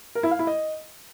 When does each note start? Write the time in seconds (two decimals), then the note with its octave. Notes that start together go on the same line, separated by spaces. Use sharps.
0.15 A#4
0.23 E4
0.31 F5
0.39 E4
0.47 D#5